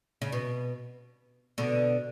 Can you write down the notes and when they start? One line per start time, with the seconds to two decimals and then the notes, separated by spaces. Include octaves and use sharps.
0.22 C#3
0.32 B2
1.58 B2 D3